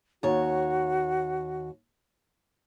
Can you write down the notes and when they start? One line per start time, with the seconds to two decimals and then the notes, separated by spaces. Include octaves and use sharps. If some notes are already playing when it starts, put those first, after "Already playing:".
0.23 D#2 F#4 C#5